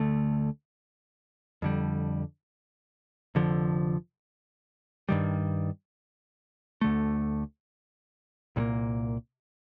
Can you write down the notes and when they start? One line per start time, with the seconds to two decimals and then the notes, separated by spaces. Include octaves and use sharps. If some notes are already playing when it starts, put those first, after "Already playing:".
Already playing: D2 D3 A3
1.62 F2 D3 G3
3.35 F1 F2 D3 F3
5.09 G2 D#3 G3
6.81 D2 D3 A3
8.56 C2 A#2 G3 A#3